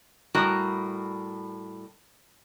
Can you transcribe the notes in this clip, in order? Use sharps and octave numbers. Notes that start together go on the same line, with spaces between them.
A2 G3 F#4 A#4